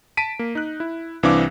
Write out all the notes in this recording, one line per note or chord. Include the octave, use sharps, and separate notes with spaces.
A5 B6 D7 D#7
A#3
D#4 F#6
E4
C2 E3 C4 D4 F5 D6